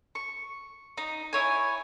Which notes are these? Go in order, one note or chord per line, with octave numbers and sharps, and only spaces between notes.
C#6
D#4
E4 C#5 G#5